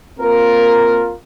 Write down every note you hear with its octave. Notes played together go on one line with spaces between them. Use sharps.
A#3 C4 F4 A#4